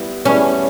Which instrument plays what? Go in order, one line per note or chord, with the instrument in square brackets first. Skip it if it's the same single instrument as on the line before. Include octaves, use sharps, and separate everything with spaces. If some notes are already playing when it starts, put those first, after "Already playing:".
Already playing: [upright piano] G3 B3 E4
[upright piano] G3 B3 E4 G#4 [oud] C#4